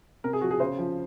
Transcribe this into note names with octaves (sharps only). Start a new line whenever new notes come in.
C3 A#4
G#4
F3 F#4
G#4
C#3 C5
F3